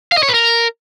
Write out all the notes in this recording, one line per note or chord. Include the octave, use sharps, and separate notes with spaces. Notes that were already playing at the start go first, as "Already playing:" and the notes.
F5
D#5
C#5
B4
A#4